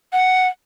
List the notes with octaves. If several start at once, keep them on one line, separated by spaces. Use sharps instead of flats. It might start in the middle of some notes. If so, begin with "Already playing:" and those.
F#5